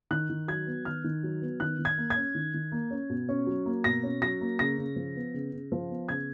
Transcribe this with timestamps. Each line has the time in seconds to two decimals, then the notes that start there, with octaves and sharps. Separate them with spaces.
0.11 D#3 F#6
0.30 D#3
0.48 F#3 G#6
0.67 B3
0.85 D#3 F6
1.04 D#3
1.23 F#3
1.42 B3
1.60 D#3 F#6
1.79 D#3
1.85 G#6
1.98 A#3
2.10 G#6
2.16 C#4
2.35 D#3
2.54 D#3
2.72 A#3
2.91 C#4
3.10 B2
3.29 C#4
3.47 F#3
3.66 A#3
3.84 B2 A#6
4.03 C#4
4.22 F#3 A#6
4.41 A#3
4.59 C#3 A#6
4.78 C#3
4.96 F3
5.16 B3
5.34 C#3
5.53 C#3
5.72 F3
5.90 B3
6.09 C#3 G#6